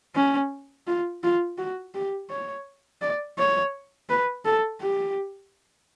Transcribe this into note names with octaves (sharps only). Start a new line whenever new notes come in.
C#4
F4
F4
F#4
G4
C#5
D5
C#5
B4
A4
G4